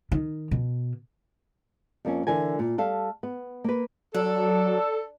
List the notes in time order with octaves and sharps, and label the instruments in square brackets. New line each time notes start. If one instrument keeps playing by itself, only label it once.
[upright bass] D#3
B2
[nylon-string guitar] F2 A#3 C#4
D3 E3 A#4 G#5
A#2
G3 A4 F5
B3
A#3 B4
[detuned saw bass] F#3 [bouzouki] D4 [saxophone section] A4